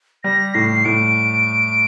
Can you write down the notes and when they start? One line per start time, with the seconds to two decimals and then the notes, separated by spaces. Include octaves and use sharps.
0.24 G3 A#6
0.54 A2 C7
0.85 A2 D7